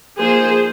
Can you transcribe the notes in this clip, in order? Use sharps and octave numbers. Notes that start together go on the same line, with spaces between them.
F3 A#3 D#4 G#4 C5